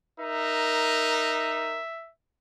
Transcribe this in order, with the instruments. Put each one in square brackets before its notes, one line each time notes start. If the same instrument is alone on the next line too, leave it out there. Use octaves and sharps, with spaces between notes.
[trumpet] D#4 [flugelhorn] A#4 [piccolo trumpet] E5